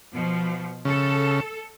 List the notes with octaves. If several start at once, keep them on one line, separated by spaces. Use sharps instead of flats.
B2 F3
C#3 A4